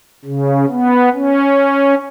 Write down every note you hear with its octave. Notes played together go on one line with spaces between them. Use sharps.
C#3
B3
C#4